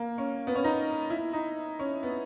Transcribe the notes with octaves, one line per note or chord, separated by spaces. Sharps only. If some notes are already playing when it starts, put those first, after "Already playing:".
Already playing: A#3
C#4
B3
C#4
D#4
E4
D#4
C#4
B3